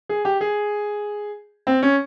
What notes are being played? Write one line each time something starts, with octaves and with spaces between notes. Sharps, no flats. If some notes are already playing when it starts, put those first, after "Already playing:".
G#4
G4
G#4
C4
C#4